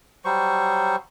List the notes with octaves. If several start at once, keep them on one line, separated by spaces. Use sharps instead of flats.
F#3 G3 C5 C#6